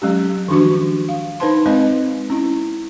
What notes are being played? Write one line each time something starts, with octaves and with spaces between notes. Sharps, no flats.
F#3 G#3 C#4 G4
D#3 F3 D4 F#4 C#6
F5
D#4 B4 C5 A5 C6
G#3 C4 B4 D#5
C#4 E4